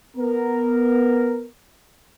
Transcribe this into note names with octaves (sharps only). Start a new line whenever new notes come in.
B3 A#4